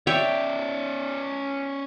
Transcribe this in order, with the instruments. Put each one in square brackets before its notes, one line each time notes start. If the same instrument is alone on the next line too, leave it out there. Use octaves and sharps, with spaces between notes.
[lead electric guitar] C#4 D5 [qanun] C#5 E5 G5